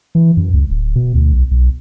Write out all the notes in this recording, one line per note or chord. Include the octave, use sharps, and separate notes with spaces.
E3
F#2
C#2
D1
B2
D2
B1
B1